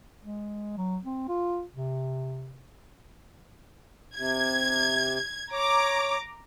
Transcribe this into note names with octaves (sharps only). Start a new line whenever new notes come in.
G#3
F#3
C4
F4
C3
C3 G#6
C#5 A#5 D6